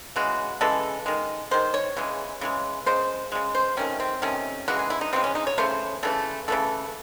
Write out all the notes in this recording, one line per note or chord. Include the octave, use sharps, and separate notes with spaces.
C#3 E3 G#3 F#4
C#3 E3 G#3 A4
D#3 G#3
D#3 G#3 C5
C#5
C#3 E3 G#3
C#3 E3 G#3
C#3 G#3 C5
C#3 G#3
C5
C3 D#3 A3 C#4
C4
C3 D#3 A3 C#4
C#3 E3 G#3 F#4
G#4
E4
D#4
C#3 E3 G#3 C4
C#4
D#4
C#5
C#3 E3 A3 C5
C#3 E3 A3 A4
C#3 E3 A3 A4